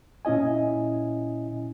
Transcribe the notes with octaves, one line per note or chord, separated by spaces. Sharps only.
A#2 C#4 E4 D#5 G#5